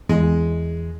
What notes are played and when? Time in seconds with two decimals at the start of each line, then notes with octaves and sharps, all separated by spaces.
0.09 E2 G#3